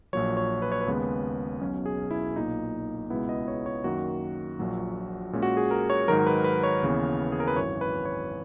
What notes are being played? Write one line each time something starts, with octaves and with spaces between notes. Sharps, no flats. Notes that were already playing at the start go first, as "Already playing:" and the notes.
A#1 A#2 F#3 C#5
C#5
B4
C#5
B4
D#2 C#3 G#3 B3
B1 B2 F#3 C#4
G#4
E4
B1 A#2 A#3 D#4
C#2 B2 G#3 B3 E4
D#5
C#5
C#5
F#2 D#3 A#3 F#4
A#1 A#2 F#3
A#2 G#3 C#4
F#4
G#4
A#4
C#5
G#2 D#3 F#3 A#4
B4
B4
C#5
D#2 C#3 E3 B3
G#4
A#4
B4
G#1 F#2 E3 C#5
B4
C#5